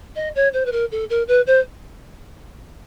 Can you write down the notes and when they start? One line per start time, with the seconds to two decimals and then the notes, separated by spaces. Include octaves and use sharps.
0.16 D#5
0.35 C#5
0.53 C5
0.66 B4
0.72 A#4
0.92 A4
1.10 A#4
1.28 B4
1.47 C5